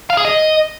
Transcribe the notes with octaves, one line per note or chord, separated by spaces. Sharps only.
F5
G#4
D#5